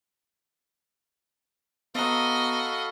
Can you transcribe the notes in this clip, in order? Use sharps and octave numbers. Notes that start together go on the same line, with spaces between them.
B3 F#4 A4 D#5 F5 A#5 B5